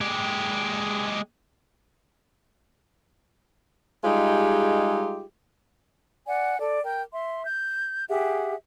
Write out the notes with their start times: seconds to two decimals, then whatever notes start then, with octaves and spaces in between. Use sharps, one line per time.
0.01 G#3 G4
4.04 G3 G#3 D#4 F4 G4 G#4
6.26 D5 F#5 G#5
6.59 A4 D5
6.82 A#4 G5
7.12 E5 C6
7.45 G6
8.08 G4 G#4 E5 F#5